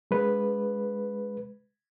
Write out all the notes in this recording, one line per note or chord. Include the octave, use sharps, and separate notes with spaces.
G#3 B4